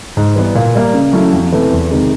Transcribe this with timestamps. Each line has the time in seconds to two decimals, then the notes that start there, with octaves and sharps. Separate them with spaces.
0.17 G#2
0.36 E3 G3 B3
0.55 A#2
0.75 G3 A#3
0.94 C#3
1.13 F#3 A3 C#4 E4
1.33 F2
1.52 C3 E3 A3
1.71 E2
1.91 C3 D#3 G#3